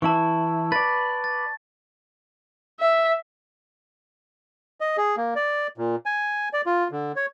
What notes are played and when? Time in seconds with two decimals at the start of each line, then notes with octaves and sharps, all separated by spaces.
0.02 E3 E4 A5 C#6
0.72 B4 D5 A6
1.24 A6
2.80 E5
4.80 D#5
4.97 G#4
5.17 A#3
5.36 D5
5.78 A#2
6.06 G#5
6.53 D5
6.66 F4
6.91 D3
7.16 C#5